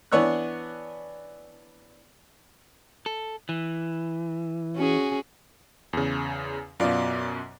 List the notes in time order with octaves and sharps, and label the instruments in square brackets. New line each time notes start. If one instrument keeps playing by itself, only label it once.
[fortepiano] E3 B3 D4 C#5 E6 F#6
[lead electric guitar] A4
E3
[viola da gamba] C#4 F#4 G#4
[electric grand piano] E2 C#3
[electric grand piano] F#2 B2 [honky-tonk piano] F4 D5